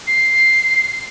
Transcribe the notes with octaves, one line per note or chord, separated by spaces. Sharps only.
C7